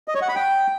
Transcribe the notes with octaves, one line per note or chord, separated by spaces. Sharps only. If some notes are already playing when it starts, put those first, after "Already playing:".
D#5
C#5
F#5
B5
G5